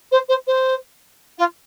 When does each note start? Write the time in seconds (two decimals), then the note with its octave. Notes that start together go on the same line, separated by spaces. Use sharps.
0.11 C5
0.28 C5
0.47 C5
1.38 F4